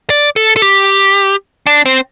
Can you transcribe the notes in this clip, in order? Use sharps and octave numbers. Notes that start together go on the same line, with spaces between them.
D5
A4
A4
G4
D4
C4